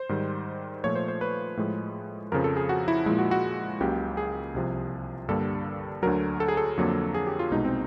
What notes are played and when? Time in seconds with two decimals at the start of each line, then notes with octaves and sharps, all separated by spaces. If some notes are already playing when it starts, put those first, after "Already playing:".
Already playing: C5
0.09 G#2 D#3 G3
0.84 A#2 F3 A3 C#5
0.95 C5
1.08 C5
1.21 B4
1.57 A2 F3 G#3
2.32 F2 C#3 F3 A#4
2.44 A4
2.57 G#4
2.69 F#4
2.88 E4
3.06 A#2 F3 G#3 E4
3.19 F#4
3.31 F#4
3.81 C#2 C#3 F#3 A#3 G4
4.17 G#4
4.55 C2 C3 F3
5.29 G2 D3 G3 A#3 A4
6.03 D2 D3 F#3 A#4
6.40 A4
6.48 G#4
6.57 A4
6.77 F2 D3 F#3 A#3
7.14 G#4
7.27 G4
7.39 F4
7.51 C2 B2 G#3 D#4
7.65 C4